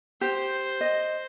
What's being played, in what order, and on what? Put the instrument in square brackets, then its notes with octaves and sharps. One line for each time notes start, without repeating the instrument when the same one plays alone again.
[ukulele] G4 [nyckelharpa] C5
[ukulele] D#5